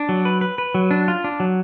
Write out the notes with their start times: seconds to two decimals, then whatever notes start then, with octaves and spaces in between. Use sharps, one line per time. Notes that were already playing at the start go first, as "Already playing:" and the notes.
Already playing: D4
0.09 F#3
0.25 B4
0.41 B4
0.58 B4
0.75 F#3
0.91 D4
1.08 F4
1.24 D4
1.40 F#3